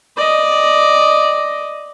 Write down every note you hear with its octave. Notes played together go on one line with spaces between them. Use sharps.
D5 D#5